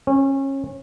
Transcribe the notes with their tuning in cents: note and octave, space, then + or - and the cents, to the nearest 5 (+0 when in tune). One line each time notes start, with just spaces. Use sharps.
C#4 -25